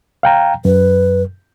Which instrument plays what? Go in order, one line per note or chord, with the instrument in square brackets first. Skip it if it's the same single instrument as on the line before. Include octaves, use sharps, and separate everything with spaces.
[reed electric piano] F5 G5 A#5
[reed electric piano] F#2 [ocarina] B4